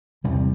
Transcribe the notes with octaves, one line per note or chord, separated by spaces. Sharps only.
E2 C3 G3